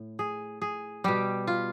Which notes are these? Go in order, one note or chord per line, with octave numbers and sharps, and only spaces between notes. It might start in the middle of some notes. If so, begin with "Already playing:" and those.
Already playing: A2
G#4
G#4
B2 G3 G4
F4